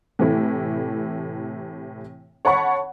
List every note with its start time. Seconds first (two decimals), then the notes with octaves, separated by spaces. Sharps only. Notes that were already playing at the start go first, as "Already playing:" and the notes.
0.19 A2 C3 E3 A3 E4
2.45 C#5 F#5 A5 B5 C#6